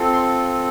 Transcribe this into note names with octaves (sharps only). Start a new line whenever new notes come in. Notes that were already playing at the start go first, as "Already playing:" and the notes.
Already playing: C4 F4 A4
C6